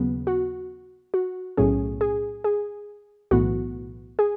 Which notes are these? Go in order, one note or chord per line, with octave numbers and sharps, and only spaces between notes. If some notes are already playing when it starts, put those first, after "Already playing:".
Already playing: D#2 C#3 F#3 B3
F#4
F#4
B1 A2 F#3 C#4 G#4
G#4
G#4
B1 A2 E3 B3 F#4
G#4